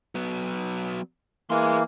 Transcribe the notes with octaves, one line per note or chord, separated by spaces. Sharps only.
F#3 B3
E3 A#3 G#4 C6